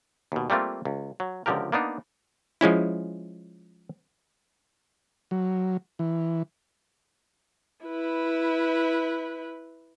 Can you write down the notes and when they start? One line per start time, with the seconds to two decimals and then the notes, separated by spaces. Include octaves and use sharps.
0.32 D#2 B2
0.50 G3 A3 A#3 C4 F4
0.85 C#2
1.20 F#3
1.46 C#2 D3 F3 G4 A#4
1.72 A#3 B3 D4 D#4
2.61 F3 G#3 C#4 E4
5.31 F#3
5.99 E3
7.85 E4 B4